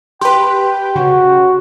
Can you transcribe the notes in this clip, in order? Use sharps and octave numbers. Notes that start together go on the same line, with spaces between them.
G4 B4 G5 C6
C#3 F#4